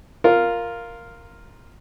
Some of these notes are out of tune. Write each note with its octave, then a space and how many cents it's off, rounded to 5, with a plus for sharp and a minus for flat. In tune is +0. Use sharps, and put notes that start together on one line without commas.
F4 +0 A#4 +0